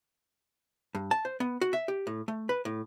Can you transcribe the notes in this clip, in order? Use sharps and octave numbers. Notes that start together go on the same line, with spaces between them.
G2
A5
C5
B3
F#4
E5
G4
A2
A3
B4
A2